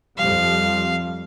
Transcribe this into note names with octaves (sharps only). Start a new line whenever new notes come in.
F2 F3 G3 F5